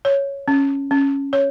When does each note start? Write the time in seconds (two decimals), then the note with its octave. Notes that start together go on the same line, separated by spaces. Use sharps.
0.05 C#5
0.48 C#4
0.91 C#4
1.33 C#5